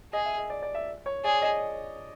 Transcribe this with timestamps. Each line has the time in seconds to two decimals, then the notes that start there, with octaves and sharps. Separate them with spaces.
0.13 G#4 D#5
0.25 E5
0.38 D#5
0.50 D5
0.62 D5
0.75 E5
1.06 C#5
1.24 G#4 D5
1.42 D#5